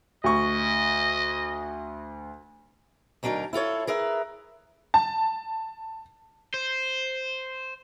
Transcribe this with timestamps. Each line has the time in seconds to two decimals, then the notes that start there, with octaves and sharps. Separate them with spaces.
0.24 D2 D#5 C#6
3.23 D2 F#3 D4 D#4 A#4
3.53 E4 F4 A4 C#5
3.87 G#4 A#4 B4 E5
4.94 A5
6.54 C5